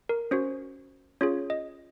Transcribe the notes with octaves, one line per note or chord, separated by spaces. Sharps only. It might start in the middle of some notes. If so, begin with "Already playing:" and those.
A#4
C#4 F#4 C5
C#4 F4 G#4 C#5
D#5